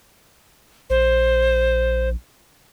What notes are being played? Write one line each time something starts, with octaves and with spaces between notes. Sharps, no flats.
A#1 C5